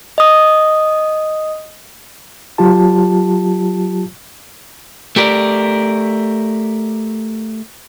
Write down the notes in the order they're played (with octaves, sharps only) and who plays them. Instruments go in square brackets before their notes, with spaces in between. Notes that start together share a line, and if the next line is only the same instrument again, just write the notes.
[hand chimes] D#5 D#6
[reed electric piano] F#3 F4 G4 A5
[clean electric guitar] A3 G4 A#4 D5